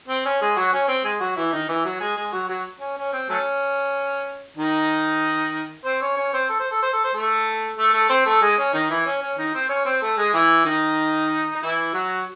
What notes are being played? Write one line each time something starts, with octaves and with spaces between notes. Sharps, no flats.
C4
C#4
G#3 G#4
F#3 F#4
C#4
C4
G#3 G#4
F#3 F#4
E3 E4
D#3 D#4
E3 E4
F#3 F#4
G#3 G#4
G#3 G#4
F#3 F#4
F#3 F#4
C#4
C#4
C4
F#3 A3 C#4
D#3 D#4
C4 C5
C#4 C#5
C#4 C#5
C4 C5
A4
C5
A4
C5
A4
C5
A3 A4
A3 A4
A3 A4
C4 C5
A3 A4
G#3 G#4
C#4
D#3 D#4
E3 E4
C#4
C#4
D#3 D#4
C4 C5
C#4 C#5
C4 C5
A3 A4
G#3 G#4
E3 E4
D#3 D#4
D#4
E3 E4
F#3 F#4